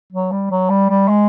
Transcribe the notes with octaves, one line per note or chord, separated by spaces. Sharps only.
F#3
G3
F#3
G3
G3
G#3